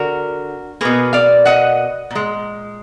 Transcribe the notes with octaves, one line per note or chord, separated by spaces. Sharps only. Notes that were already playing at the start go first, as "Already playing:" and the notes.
Already playing: D3 F#4 A#4
B2 A#3 G#4 B4
D5 F5
D#5 F#5
A#2 G#3